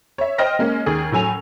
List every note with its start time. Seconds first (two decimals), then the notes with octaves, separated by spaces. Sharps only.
0.18 C#5 E5
0.38 C5 D#5 G5 F6 A#6
0.59 G#3 A#3 C#4
0.86 D#2 G#4
1.12 A2 F#3 G#5 F7